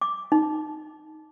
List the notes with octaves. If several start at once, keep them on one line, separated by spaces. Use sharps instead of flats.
D6
D#4